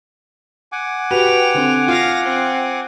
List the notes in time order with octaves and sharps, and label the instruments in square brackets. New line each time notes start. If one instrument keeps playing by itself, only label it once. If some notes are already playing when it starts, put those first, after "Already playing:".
[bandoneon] F#5 G#5 D6
[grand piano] F#4 G4 B4 [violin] G5 F7
[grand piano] D3 C4
[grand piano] F4 [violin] F5 A#6
[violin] C4